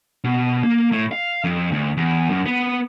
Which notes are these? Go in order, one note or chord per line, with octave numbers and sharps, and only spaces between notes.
B2
A#3
A2
F5
F2
D2
E2
F#2
B3